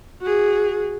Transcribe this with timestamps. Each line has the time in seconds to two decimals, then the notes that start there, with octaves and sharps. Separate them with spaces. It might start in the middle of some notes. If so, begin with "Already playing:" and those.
0.22 F#4 G#4